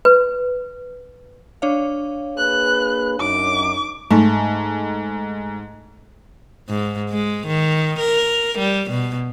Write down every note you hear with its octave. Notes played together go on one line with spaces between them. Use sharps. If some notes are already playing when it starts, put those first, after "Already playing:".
B4
D4 C#5 F5
A#3 G#4 B4 F#6
F#2 D#4 D6
G#2 A3
G#2
G#3
D#3
A#4
G3
B2